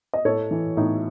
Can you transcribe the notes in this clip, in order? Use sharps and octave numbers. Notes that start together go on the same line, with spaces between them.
D#5
A2 A4 C#5
E3
A2 D#4